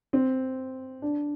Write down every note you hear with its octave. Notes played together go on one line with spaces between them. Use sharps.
C4
D4